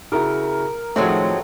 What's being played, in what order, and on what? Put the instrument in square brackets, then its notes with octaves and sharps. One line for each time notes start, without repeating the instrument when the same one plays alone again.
[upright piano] C#3 E4 F#4 [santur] A#4 D#6
[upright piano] A2 D#3 F3 [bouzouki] F#3 G#3 C4 [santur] A3